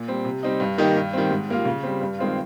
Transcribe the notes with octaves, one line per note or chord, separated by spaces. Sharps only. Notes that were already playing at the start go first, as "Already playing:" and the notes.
Already playing: A#2
G3 C4
C3
G3 C4 D#4
G2
D#3 A#3 D#4 G4
G2
D#3 G3 C4
G#2
G3 A#3 F4
C#3
G3 C4
G2
D#3 G#3 C4 F4